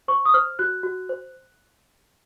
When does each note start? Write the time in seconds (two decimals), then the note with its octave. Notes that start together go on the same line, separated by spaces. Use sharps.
0.08 C5 C#6
0.25 D#6
0.34 C5 F6
0.59 F#4 F#6
0.83 F#4
1.09 C5